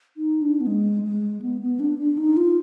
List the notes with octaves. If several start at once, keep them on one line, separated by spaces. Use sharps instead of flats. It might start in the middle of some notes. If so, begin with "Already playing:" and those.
D#4
D4
B3
G#3
G#3
B3
B3
D4
D4
D#4
F4